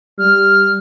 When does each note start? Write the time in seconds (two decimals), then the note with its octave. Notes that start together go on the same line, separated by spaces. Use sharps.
0.19 G3 F6